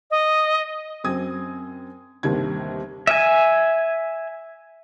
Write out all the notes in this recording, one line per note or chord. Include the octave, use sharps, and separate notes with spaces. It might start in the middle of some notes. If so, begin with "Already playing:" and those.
D#5
F#2 C4 D#6 G#6
G1 D#2 C3 D#3 G#6
E5 G#5